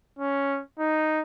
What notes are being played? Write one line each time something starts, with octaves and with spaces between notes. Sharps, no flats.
C#4
D#4